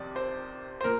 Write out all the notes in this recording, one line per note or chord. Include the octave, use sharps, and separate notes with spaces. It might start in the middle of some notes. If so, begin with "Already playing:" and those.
Already playing: F2 C3 D#3 D5
C5
C5
A#2 A#4